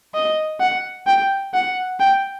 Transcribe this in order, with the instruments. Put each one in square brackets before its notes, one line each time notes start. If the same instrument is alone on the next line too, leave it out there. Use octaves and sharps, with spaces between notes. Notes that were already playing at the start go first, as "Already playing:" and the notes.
[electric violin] D#5
F#5
G5
F#5
G5